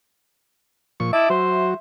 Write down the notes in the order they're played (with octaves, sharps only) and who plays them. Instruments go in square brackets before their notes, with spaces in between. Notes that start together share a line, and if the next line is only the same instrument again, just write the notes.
[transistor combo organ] A#2 F3 C#6
[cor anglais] E4 [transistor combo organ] D#5 A5 D6 [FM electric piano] E5
[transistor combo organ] F#3 F#4 [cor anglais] C5